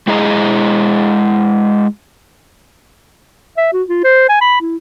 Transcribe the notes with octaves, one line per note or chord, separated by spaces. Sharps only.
G#3 E4 G#4 D#5 A#5
E5
F#4
F4
C5
G#5
B5
E4